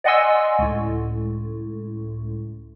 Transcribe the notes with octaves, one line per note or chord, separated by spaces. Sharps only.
D5 D#5 F#5 G#5 C6 E6
C#2 A2